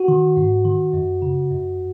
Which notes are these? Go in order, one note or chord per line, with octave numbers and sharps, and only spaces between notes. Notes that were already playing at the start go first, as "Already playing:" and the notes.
Already playing: F#4
D#3
G#2
D#3
F#2
C#3
F#2